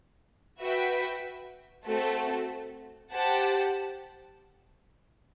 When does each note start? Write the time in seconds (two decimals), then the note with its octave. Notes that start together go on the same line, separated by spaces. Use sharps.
0.59 F#4 B4 E5 G5
1.86 A3 C4 F#4 A4
3.11 G4 C5 F#5 A5